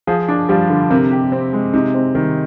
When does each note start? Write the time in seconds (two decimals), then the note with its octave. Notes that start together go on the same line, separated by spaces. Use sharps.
0.07 F3 G#4
0.28 D4
0.49 F3 G3
0.70 D3
0.90 C3 A#4
1.11 G4
1.32 C4
1.53 G#3
1.73 C3 D#4
1.94 C4
2.15 D#3 G3